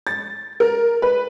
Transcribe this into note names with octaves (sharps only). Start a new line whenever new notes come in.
A6
A#4
B4